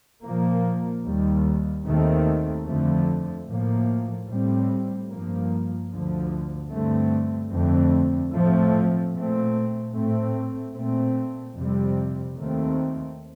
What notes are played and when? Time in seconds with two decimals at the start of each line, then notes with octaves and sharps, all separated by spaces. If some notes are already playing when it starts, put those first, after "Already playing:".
0.23 A#2 F3 A#3
1.05 D#2 D#3 G3
1.85 D#2 D#3 A3 C4
2.66 F2 D3 F3 A3
3.46 A2 F3 A#3
4.28 A2 G3 C4
5.09 G2 F3 A#3
5.89 D2 D3 F3
6.70 G2 D3 A3 C4
7.51 F2 D3 A3 C4
8.32 A2 F3 A3 C4
9.12 A#2 A3 C4
9.93 A2 A3 C4
10.73 A#2 A3 C4
11.55 F2 C3 G3 C4
12.35 D#2 D#3 A3 C4